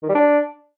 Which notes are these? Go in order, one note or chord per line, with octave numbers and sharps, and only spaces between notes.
D#3
G3
D4